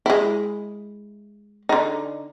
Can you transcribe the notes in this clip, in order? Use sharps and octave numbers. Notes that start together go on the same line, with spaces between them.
G#3 E4
D3 D#4